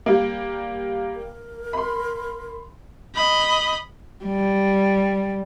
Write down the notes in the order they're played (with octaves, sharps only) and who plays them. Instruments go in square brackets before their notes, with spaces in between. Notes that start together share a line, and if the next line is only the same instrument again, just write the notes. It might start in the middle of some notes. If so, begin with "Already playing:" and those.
[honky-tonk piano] G3 A#3
[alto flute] A#4
[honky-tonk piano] B5 C6
[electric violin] D#5 B5
[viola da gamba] G3